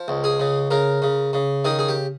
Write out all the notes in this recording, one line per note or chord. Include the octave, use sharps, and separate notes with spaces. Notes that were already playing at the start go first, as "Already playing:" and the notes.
Already playing: F3
C#2
G#4
C#3
C#3 A#4
C#3
C#3
D#3 G#4
G#4
G4